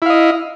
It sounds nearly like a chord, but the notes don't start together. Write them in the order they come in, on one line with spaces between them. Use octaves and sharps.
E4 F5 D#5